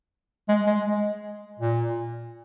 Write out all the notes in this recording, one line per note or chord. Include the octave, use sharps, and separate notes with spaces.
G#3
G#3
G#3
A#2